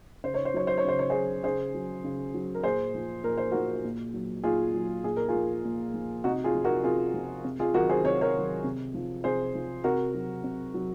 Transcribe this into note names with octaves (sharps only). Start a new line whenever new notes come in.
C#3 C5
C#5
C5
F#3 C#5
C5
C#5
C#3 C5
C#5
F#3 G#4 C5
C#3 G#4 C5
F#3
C#3
F#3
A#4
A#2 G#4 C5
F3
A#2 A#4
C5
F3 F#4 A#4
A#2
F#3
A#2 F4 G#4
F#3
A#2 G#4
A#4
F4 G#4
F3
A#2
F3
C3 D#4 F#4
F4 G#4
F3
F#4 A#4
C3 F4 G#4
F3
C3
F4 G#4
D#3 F#3 F#4 A#4
G#4 C5
C3 C#5
A#4 C#5
D#3 F#3
C3
F3
C3 G#4 C5
F3
C3 F#4 A#4
F#3
C3
F#3